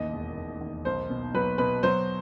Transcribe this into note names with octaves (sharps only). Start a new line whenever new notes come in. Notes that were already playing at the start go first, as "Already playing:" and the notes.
Already playing: A1 D#2 D#5
E1
E1
D#2
B1 C5
B2
F#3 B4
B2 B4
F#3 C5